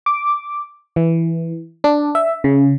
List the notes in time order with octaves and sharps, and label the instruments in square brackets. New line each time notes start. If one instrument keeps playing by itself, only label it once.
[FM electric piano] D6
E3
D4
E5
C#3